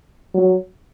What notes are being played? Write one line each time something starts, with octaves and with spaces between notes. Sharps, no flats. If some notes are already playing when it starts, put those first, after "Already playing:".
F#3